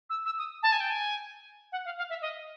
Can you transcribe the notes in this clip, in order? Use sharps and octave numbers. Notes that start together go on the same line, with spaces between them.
E6
E6
D#6
A5
G#5
G5
G#5
F#5
F5
F5
E5
D#5